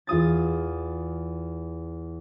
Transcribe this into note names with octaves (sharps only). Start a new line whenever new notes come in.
E2 F4 D#6 A6